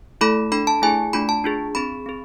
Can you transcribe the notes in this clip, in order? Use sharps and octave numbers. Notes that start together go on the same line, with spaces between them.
A3 E4 A4 B5
D4 A4 B5
A5
A3 E4 G#4 G#5
A3 D4 F4 B5
A5
D4 F4 G#4
C4 G#4 B5
C4 G#4